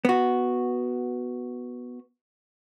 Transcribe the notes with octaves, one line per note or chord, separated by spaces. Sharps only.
B3 F#4